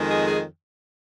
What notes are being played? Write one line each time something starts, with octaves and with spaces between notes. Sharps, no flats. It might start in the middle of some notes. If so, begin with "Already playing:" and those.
Already playing: F2 D#3 G#3
G#4
G#4